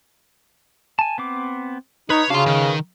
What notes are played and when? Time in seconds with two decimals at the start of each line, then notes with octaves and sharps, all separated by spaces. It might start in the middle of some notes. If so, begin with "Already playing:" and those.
0.99 G#5 A5
1.18 B3 C4 D6
2.10 D#4 B4 C#5
2.30 C#3 C#4 D4 F#4 F5 C6
2.46 D#3 B4